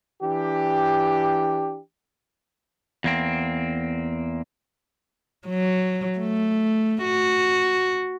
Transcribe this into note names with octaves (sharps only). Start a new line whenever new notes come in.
E3 D4 G4
E2 A#3 C4
F#3
A3
F#4